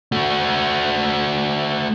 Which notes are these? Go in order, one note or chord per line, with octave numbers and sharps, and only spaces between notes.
A3 F#4